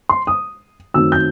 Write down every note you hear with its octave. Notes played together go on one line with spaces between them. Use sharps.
C6
D#6
F#2 D#3 F#3 A3 C4 E6
G6